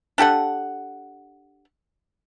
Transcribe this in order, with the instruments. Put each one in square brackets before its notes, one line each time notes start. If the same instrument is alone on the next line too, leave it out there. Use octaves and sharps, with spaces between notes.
[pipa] D4 G4 A4 F#5